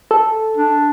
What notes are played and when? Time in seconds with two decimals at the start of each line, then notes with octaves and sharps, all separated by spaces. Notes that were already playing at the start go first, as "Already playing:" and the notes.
0.11 A4
0.57 D4